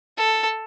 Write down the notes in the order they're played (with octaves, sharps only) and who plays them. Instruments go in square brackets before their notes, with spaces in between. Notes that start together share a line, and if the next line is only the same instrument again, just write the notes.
[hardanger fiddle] A4